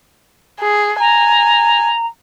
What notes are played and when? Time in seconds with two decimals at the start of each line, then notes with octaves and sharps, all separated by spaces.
0.60 G#4
1.00 G#5 A#5